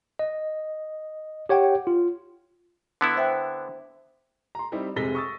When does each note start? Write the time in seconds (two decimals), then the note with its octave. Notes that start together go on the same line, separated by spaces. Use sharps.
0.19 D#5
1.49 G4 C#5 F#5 G5
1.87 F4
3.01 D3 B3 E4
3.16 C5 E5 G5
4.55 A#5 C6
4.72 G3 C4 D#4 E4 G4
4.96 F1 C3 G#3 A#6 B6 G7
5.15 C#6 D#6 E6 A6